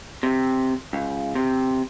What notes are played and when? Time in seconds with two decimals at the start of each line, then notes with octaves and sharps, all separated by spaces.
0.23 C3
0.93 C#2
1.35 C3